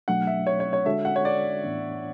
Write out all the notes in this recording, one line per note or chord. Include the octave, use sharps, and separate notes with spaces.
B2 F#3 A3 D4 F#5
E5
C#5
C#5
C#5
D3 G#3 D4 F#4 A4 E5
F#5
C#5
D5
A2 E3 B3 D4